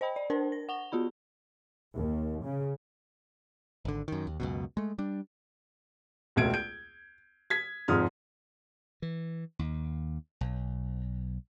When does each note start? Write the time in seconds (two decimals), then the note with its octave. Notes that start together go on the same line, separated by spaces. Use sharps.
0.01 C5 D#5 G5 B5
0.16 D5
0.30 D4 A#4 C5 A5
0.52 A#6
0.69 F#5 C#6 F7 G7
0.92 B3 F4 F#4 B5
1.95 D#2
2.44 C#3
3.85 G#1 D3
4.08 F#2 D#3
4.27 D#2
4.40 C#2 F#2 B2
4.77 G#3 A3
4.98 G3 D4
6.36 E1 C#2 A3 G#6 D7
6.53 G6 D7
7.50 G#6 B6
7.88 F1 G#2 F3 D#6 F6
9.02 E3
9.59 D#2
10.41 B1